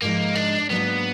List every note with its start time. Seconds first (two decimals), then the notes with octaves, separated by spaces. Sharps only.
0.02 G#2 F3 G#3 A#3 D#4
0.35 D4
0.69 G#2 F#3 A#3 B3 D4